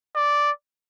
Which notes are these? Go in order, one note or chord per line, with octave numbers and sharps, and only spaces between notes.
D5